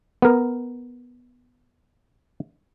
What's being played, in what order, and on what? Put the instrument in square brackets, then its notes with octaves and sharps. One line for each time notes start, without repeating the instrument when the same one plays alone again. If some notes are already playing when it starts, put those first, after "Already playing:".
[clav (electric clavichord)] B3 A#4